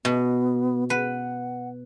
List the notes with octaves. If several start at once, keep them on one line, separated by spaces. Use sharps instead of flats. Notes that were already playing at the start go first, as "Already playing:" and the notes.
B2 B3
B4 F#5